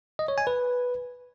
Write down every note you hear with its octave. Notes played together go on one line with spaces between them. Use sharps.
D#5
C#5
G#5
B4